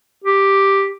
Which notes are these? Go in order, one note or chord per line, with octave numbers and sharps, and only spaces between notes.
G4